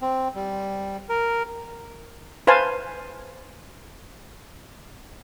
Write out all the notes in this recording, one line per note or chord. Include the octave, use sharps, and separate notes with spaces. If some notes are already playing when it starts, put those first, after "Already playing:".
C4
G3
A#4
B4 C5 F5 G#5 A5